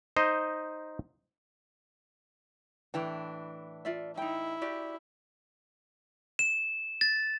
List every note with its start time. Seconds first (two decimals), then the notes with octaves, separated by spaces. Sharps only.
0.17 D#4 C5 D#5
2.94 A2 E3 D4 G5
3.85 F4 D5 E5
4.17 D#4 E4 G5
4.62 F#4 G4 D5
6.39 E7
7.01 A6